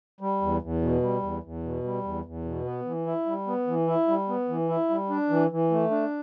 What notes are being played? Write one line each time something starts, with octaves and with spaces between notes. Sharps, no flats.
G3
E2
E2
B2
G3
E2
E2
B2
G3
E2
E2
B2
B3
E3
E4
G3
B3
E3
E4
G3
B3
E3
E4
G3
D4
E3
E3
A3
D4